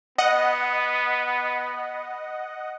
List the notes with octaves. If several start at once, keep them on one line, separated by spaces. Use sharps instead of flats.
B3 D#5 F#5